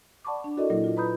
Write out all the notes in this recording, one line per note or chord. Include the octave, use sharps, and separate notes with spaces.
D5 F#5 A5 B5 C#6 D6
D4
E4 F#4 A4 A#4 D5 D#5
A#2 F#3 A#3 E4 A#4
F4
B4 A#5 B5 D#6 G6